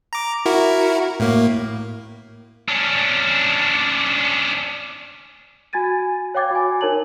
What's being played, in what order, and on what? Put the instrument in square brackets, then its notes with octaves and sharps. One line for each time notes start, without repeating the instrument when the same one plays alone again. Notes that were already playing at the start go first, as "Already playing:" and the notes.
[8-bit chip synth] A#5 D6
E4 F#4 A#4
A2 A#3
[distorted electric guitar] C#4 D4
[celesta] F#4 G#5 G#6 A6 D#7
C#5 F5 G5 D6 G#6 A6
F#4 G#5
D#4 A#4 C#5 A5 F#7